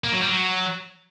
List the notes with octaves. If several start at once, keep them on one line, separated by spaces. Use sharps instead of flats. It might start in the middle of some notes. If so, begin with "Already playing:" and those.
A#3
F#3
G3
F#3